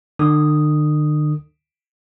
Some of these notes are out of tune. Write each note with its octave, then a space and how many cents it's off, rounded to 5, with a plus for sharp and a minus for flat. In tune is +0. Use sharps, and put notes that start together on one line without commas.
D3 +45 D#6 +0